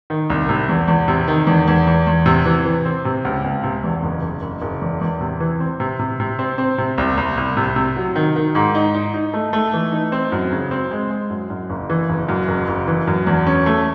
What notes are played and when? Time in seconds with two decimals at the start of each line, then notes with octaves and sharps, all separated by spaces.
0.10 D#3
0.30 C2
0.49 C3
0.69 E2
0.88 E2
1.08 C3
1.28 D#3
1.47 E2
1.68 E2
1.87 E2
2.07 E2
2.26 C3
2.46 E3
2.65 E3
2.85 C4
3.05 C3
3.25 C#2
3.44 C#2
3.63 C3
3.84 E2
4.03 F#1
4.22 F#1
4.42 F#1
4.62 F#1
4.81 E2
5.01 E2
5.21 C3
5.40 E3
5.60 C4
5.80 C3
5.99 C3
6.20 C3
6.39 C4
6.58 C4
6.78 C3
6.98 C2
7.17 C2
7.37 C2
7.57 C3
7.76 C3
7.96 F#3
8.16 D#3
8.36 D#3
8.55 G#2
8.75 D#4
8.94 D#4
9.14 D#4
9.34 A3
9.53 A3
9.73 E3
9.92 D#4
10.12 C4
10.32 F#2
10.52 C#3
10.71 C4
10.91 G#3
11.10 G#3
11.30 F#2
11.50 F#2
11.70 F#1
11.90 E3
12.09 F#1
12.28 F#2
12.48 F#1
12.68 F#1
12.88 E3
13.07 F#2
13.27 E2
13.47 C#4
13.66 A3